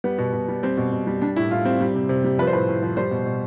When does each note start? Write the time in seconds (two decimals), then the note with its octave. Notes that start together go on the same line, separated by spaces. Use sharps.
0.04 G3 B3
0.18 B2
0.33 B2
0.48 G3
0.63 G3 C4
0.77 B2
0.92 B2
1.07 G3
1.22 G3 D4
1.36 A2 E4
1.50 A2 F4
1.65 G3 C4
1.81 G3
1.95 C3
2.09 C3
2.24 G3
2.39 F3 B4
2.47 C5
2.53 A2 B4
2.68 A2
2.83 F3
2.97 G3 C5
3.11 B2
3.26 B2